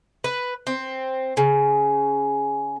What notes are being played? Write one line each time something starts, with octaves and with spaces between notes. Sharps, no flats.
B4
C4
C#3